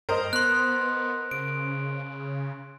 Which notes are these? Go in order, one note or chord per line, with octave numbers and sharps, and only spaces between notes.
G2 A#4 C5 D#5
B3 C6 F#6
C#3 D7